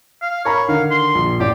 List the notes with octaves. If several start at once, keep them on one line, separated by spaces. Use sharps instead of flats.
F5
A#4 C#5 A#5 B5
D3 D#3 F5
C6
A#1
A1 G4 D5